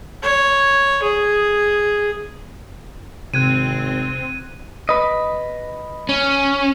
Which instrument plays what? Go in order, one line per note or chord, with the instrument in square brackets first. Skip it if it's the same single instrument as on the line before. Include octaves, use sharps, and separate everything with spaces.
[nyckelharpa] C#5
G#4
[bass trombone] G#1 [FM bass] C3 [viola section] C4 [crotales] F#6 G#6 D#7
[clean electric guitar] B4 D#5
[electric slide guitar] C#4